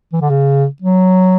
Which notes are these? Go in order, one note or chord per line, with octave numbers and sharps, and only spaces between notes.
E3
D3
C#3
F#3